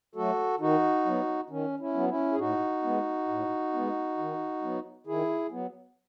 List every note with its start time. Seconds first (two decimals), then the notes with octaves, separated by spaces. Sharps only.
0.15 F#3 A3 F#4 A4
0.60 D#3 D#4 F#4
1.05 F#3 B3
1.50 D#3 C#4
1.79 C#4 E4
1.94 F#3 B3
2.09 C#4 E4
2.32 G#4
2.38 A2 D#4 F#4
2.83 G#3 B3
3.28 A2
3.73 G#3 B3
4.18 D#3
4.62 F#3 B3
5.06 D#3 E4 G#4
5.51 F#3 B3